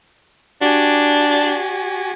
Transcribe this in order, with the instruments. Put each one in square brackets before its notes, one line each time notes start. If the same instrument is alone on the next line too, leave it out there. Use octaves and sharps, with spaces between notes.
[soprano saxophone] D4 [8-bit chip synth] F#4 G4 G#5